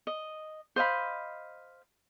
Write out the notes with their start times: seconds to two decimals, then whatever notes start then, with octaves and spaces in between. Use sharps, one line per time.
0.07 D#5
0.76 C5 D#5 F5 B5